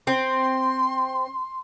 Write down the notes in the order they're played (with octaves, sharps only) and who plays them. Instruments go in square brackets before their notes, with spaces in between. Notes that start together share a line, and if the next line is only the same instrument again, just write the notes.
[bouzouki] C4 [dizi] C6